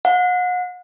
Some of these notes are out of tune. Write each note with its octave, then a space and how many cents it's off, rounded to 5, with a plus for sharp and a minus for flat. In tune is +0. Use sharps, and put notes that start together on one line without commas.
F#5 -35